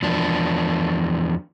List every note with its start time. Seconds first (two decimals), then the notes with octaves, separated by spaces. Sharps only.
0.02 E2 F3 D4